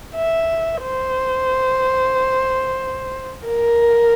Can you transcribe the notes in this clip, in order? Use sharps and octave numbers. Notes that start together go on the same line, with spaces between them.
E5
C5
A#4